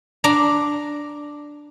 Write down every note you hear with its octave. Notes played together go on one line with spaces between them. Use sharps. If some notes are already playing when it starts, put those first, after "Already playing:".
D4 A#5